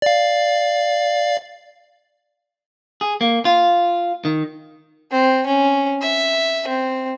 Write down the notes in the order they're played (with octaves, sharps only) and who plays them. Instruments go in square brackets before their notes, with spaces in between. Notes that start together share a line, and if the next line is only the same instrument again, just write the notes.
[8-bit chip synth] D5 F5
[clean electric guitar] G#4
A#3
F4
D#3
[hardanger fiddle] C4
C#4
E5
C4